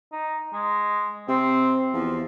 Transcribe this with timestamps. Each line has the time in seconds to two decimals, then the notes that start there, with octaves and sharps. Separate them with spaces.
0.12 D#4
0.53 G#3
1.28 C3 C4
1.94 E2 F3